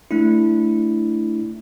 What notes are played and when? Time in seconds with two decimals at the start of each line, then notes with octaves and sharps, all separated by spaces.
0.11 A3 D4 E4